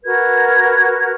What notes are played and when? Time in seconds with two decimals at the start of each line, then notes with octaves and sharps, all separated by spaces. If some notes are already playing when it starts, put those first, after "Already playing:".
0.05 F#4 A#4 B4 G#6